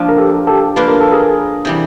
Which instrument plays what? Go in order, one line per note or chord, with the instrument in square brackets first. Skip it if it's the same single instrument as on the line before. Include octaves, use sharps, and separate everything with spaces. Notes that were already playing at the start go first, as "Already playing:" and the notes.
Already playing: [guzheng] F3 A#3 D4 F4
[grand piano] A#4
G4 A4
G4 A4
[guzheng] F3 A#3 D4 F4 [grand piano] B4
[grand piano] A#4
A4
G#4 A#4
[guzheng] C3 E3 G3